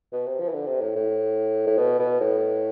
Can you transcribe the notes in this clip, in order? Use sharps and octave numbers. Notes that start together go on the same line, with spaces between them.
B2
C3
F3
E3
D3
C3
A2
A2
A2
B2
B2
A2